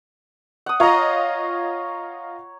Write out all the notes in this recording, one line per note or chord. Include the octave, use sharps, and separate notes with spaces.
F#5 D#6
F4 C#5 D#5 A#5